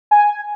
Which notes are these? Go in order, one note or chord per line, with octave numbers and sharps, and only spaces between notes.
G#5